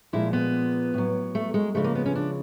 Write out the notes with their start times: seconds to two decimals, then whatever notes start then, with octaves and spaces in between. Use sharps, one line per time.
0.13 A#2 F3 G#3 E4
0.33 B3
0.94 A2 F#3
1.35 A3
1.54 G#3
1.75 C#3 F3 G#3 A3
1.84 A#3
1.95 B3
2.06 C#4
2.15 D4